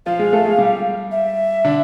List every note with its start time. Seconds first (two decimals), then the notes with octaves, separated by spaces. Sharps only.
0.06 F3 F4 F5
0.19 G#3 G#4
0.33 A3 A4
0.45 G#3 G#4
0.58 G3 G4
1.11 E5
1.65 D3 D4